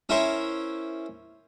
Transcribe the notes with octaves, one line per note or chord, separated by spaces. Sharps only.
C#4 E4 A#4 C5 C#5